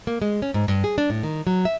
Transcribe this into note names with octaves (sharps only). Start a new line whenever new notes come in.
A#3
G#3
C#4
G#2
G2
G#4
D4
A2
D#3
F#3
E5